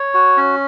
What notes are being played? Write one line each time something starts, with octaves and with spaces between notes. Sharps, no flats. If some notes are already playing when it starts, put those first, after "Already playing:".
Already playing: C#5
F#4
C#4